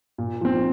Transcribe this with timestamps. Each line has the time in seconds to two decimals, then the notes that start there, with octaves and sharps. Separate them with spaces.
0.18 A#2
0.41 F3 C4